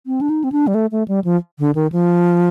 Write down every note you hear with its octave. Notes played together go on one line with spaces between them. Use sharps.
C4
D4
D#4
C4
D4
G3
A3
A3
G3
F3
D3
D#3
F3